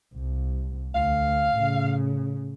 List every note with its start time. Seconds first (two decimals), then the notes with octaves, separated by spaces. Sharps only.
0.14 C2
0.94 D2 F5
1.54 A2 C#3